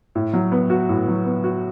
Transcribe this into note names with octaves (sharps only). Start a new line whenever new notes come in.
A2
F#3
B3
F#4
A2
F#3
B3
F#4